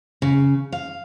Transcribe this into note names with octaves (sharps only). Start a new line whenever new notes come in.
C#3
F5